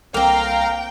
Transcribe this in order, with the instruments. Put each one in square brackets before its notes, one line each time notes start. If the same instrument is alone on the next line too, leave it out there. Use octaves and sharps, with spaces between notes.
[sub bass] C2 [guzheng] A#3 C4 [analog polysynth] F5 A#5 [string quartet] G5